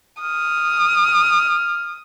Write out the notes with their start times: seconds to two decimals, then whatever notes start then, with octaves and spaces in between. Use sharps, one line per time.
0.21 D#6 F6